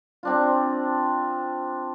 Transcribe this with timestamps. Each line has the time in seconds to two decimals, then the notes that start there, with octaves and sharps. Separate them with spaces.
0.23 C4 D4 F4